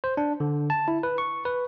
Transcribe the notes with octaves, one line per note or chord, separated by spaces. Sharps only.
C5
D4
D3
A5
E4
B4
C#6
B4